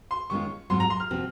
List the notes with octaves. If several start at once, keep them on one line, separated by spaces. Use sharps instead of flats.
C6
D#3 G#3 C#4 F4 C#6
G#2 F#3 C4 F4 C6
A#5
C6
F6
C3 F3 C4 F#4